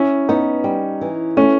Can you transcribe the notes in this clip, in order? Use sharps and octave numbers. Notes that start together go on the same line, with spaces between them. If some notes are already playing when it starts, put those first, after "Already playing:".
Already playing: C#4 E4
B3 D#4
G3
E3
A3 C#4